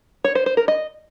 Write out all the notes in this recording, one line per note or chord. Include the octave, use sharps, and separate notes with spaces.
C#5
C5
C5
A#4
D#5